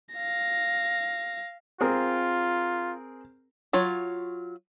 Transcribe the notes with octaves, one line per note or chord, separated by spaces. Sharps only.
F5 A#6
C4 F4 G#4 A#4
F#3 F4 C#5